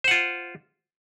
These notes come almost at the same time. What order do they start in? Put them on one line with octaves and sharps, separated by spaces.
C5 F#5 F4